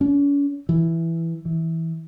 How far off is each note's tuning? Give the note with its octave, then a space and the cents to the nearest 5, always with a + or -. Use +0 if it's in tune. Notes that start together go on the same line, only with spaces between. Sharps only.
C#4 +40
E3 +5
E3 -15